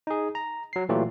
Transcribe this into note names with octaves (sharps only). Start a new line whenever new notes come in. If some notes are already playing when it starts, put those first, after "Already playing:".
D#4 G#4
A#5
F#3 C7
A#2 E3 F#3 A3 F4 G4